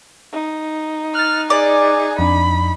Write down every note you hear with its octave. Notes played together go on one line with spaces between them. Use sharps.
D#4
F6 F#6 A6
G#4 D5
F2 D4 B5